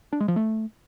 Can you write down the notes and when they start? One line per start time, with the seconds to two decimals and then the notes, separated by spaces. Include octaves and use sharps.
0.13 D4
0.20 G#3
0.28 F3
0.36 A3